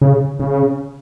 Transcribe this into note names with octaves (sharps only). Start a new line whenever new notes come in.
C#3
C#3